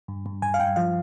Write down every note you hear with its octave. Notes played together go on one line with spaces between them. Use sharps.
G2
G2
G2 G#5
F5
G2 G5
F3 F5